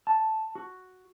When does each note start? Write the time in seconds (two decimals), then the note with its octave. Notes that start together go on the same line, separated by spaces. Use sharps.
0.07 A5
0.55 F#4